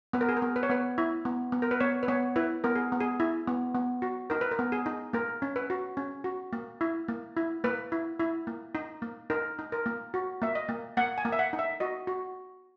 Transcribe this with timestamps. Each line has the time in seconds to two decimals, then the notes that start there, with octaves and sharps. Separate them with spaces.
0.13 B3 B4
0.21 A#4
0.29 G#4
0.37 A#4
0.42 B3
0.56 B4
0.63 C#5
0.70 B3 B4
0.98 E4
1.25 B3
1.52 B3
1.62 A#4
1.71 B4
1.80 B3 C#5
2.03 B4
2.08 B3 C#5
2.36 E4 B4
2.64 B3 A#4
2.75 G#4
2.92 B3
3.00 G#4
3.20 E4
3.47 B3
3.75 B3
4.02 F#4
4.30 D#4 A#4
4.41 B4
4.51 A#4
4.59 B3
4.72 G#4
4.86 D#4
5.13 A#3 A#4
5.42 C#4
5.56 B4
5.70 F#4
5.97 C#4
6.24 F#4
6.53 A#3
6.81 E4
7.08 A#3
7.37 E4
7.64 A#3 B4
7.92 E4
8.19 E4
8.47 A#3
8.75 D#4
9.02 A#3
9.30 D#4 A#4
9.59 D#4
9.72 A#4
9.86 A#3
10.14 F#4
10.42 A#3 E5
10.55 D#5
10.69 A#3
10.97 A#3 F#5
11.18 G#5
11.25 A#3
11.32 E5
11.39 F#5
11.53 D#4
11.59 E5
11.80 F#4 D#5
12.07 F#4